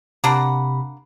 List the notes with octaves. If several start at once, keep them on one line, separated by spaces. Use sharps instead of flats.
C3 A#3 D4 F#5 B5